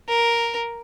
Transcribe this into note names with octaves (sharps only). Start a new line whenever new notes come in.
A#4